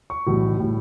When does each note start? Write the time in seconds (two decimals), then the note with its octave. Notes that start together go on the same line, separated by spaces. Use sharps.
0.10 C#6
0.27 B1 A2 E3 G3
0.60 A2 G3